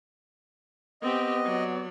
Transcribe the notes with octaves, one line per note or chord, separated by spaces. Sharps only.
B3 C4 G4 D#5
F#3 D5